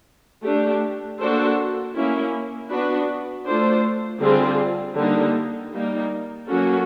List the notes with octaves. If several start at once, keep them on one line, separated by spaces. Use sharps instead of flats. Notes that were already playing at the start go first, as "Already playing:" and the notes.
A3 D4 G4
A#3 D4 F#4 A4 C5
A#3 C#4 E4
B3 D4 F#4 B4
A3 D4 F4 A4 C5
D3 G3 C4 F4 G#4
D3 G3 A#3 D#4
G3 A#3 D#4
F#3 A#3 C#4 F#4 A4